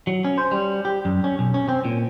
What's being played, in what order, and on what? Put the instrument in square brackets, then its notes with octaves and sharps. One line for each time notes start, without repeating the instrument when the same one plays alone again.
[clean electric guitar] F#3
C#4
C5
G3
G4
F#2
C#4
B1
C#4
C4
A#2